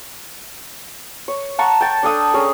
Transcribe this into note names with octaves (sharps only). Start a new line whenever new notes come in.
C#5
F#5 A5 A#5 C#6
G5 A5
D4 A4 D#6 E6
C#4 G#4 A#4